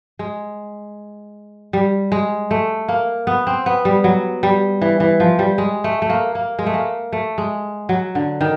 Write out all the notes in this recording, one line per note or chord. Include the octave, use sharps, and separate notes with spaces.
G#3
G3
G#3
A3
A#3
B3
C4
B3
G3
F#3
G3
E3
E3
F3
G3
G#3
A3
A3
A#3
A#3
G#3
A3
A#3
A3
G#3
F#3
D3
D#3